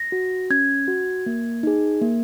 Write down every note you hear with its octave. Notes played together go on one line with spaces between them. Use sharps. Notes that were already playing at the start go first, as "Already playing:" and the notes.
Already playing: A#6
F#4
C#4 G#6
F#4
A#3
D#4 G#4
A#3